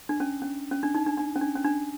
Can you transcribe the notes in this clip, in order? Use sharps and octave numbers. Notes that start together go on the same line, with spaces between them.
D4
C#4
C#4
C#4
D4
D#4
D4
D4
C#4
D4
C#4
D4